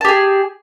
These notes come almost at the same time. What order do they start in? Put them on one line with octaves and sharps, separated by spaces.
A5 G4 G#4